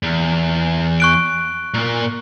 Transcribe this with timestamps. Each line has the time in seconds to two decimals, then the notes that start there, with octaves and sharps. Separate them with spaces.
0.03 E2
1.00 C#6 F#6 D7
1.74 A#2 A#3